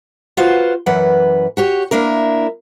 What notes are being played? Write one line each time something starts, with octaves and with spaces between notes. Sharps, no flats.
F4 F#4 B4 C5 F5
F#2 E3 B4 F#5
F#4 G4 C#5
A#3 D4 E4 A#4